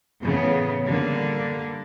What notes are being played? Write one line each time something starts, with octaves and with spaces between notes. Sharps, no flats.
A2 C#3 E3 B3
D3 G3 A#3